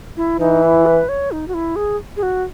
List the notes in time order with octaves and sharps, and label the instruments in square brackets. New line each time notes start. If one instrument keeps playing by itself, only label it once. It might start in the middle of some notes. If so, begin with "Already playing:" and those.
[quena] E4
[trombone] E3 [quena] D#4
[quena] E4
B4
C#5
D#4
F#4
E4
G#4
G#4
F#4